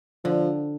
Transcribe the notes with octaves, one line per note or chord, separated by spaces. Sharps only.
D3 F3